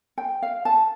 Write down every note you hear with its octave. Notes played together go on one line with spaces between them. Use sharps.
G5
F5
A5